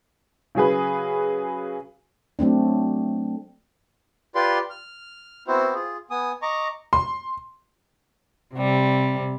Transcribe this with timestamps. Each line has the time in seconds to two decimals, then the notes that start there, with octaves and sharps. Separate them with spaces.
0.55 C#3 F#3 G#4 B4
2.39 F#3 A3 C4 D4
4.35 F4 G4 B4 D5 C6
4.70 F6
5.47 B3 C4 E4 F#4 C5
5.74 F4 G#4
6.11 B3 G#5 D#6
6.42 D#5 A#5 C#6 D6
6.93 C6
8.55 C3 G3